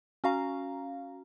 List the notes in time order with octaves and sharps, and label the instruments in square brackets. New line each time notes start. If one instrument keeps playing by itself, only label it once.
[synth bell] C#4 F#4 F5 A#5